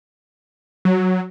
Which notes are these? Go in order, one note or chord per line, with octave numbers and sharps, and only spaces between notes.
F#3